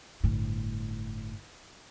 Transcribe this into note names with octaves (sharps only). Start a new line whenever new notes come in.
G1 A2